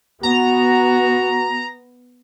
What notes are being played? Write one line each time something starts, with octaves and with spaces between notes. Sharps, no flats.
B3 F#4 A#5